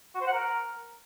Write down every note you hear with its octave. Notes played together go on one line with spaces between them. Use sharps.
F#4
C5
F#5
A#4